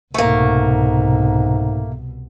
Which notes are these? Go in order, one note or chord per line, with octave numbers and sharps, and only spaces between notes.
C2 G#2 B2 A3 A#3